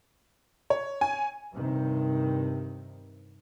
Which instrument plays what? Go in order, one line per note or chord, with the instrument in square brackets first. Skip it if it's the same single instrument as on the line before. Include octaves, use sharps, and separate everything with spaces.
[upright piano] C#5
[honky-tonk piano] G#5
[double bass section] G2 C3 D#3